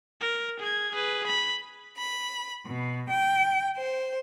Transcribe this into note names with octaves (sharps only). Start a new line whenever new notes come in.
A#4
G#4 G#6
G#4 B4
B5
B5
B2
G5
C5